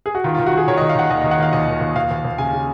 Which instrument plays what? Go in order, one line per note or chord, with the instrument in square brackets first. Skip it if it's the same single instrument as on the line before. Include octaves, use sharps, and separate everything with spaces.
[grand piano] G#4
F#4
D#3 F4
F4
D#3
F#4
D#3 G#4
D#3 C#5
D#5
D#3
F5
D#3 F#5
D#2 D#5
D#3 D#5
F#5
D#3 F5
D#2 D#5
D#3
D#2
D#2 F5
D#2
D#2
C#3 G#5
C#3